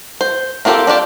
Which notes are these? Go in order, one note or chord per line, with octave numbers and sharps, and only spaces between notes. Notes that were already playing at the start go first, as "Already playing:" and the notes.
C5
A#3 C4 F4 G4 A4
D4 F4 G4 D5